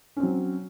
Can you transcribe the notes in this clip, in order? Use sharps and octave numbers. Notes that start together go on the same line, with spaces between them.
F#3 C4 C#4